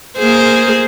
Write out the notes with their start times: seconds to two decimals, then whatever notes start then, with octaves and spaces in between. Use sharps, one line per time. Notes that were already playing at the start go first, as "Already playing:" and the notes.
0.17 A#3 G#4 C5